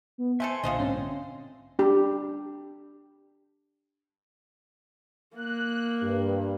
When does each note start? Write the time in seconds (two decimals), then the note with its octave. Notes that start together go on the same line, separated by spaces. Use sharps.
0.18 B3
0.40 A3 C4 A4 E5 G#5 C6
0.63 B1 A#2 D3 F4 C5 D#5
0.79 G#2 C4 C#4 C6
1.79 D4 G4
5.36 A#3 F#6
6.01 G2